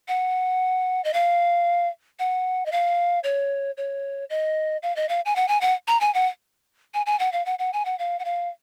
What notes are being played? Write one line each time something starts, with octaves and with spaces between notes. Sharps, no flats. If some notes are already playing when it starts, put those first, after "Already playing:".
F#5
D#5
F5
F#5
D#5
F5
C#5
C#5
D#5
F5
D#5
F5
G#5
F#5
G#5
F#5
A#5
G#5
F#5
G#5
G#5
F#5
F5
F#5
F#5
G#5
F#5
F5
F#5
F5